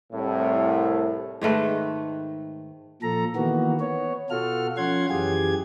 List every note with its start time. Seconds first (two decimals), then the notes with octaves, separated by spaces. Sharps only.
0.12 C2 A2
1.42 G#2 D#3 A3 B4
3.02 A#2 F3 A4 A#5
3.36 D#3 E3 A#3 B3 F#4
3.80 B3 C#5
4.30 B2 F4 F#4 A4 F6
4.77 F3 C#4 F4 F#5 C6 G#6
5.10 F#2 E3 G4 G#4 G#6